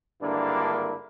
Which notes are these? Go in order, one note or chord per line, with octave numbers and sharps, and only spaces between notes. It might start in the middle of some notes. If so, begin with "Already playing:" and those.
G#1 G2 D3 A#3 D4 E4